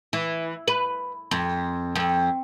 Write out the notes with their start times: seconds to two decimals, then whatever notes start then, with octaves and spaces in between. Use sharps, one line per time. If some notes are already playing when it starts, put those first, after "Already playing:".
0.13 E3
0.68 B4
1.31 F2
1.96 F2